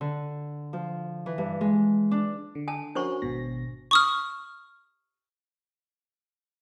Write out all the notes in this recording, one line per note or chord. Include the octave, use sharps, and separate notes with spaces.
D3
F3
E3
G2
G#3
D4
D3
G#5 A5
C#4 D4 F#4 A#4 C5 C#6
G#1 B2 A#6
C#6 D#6 F6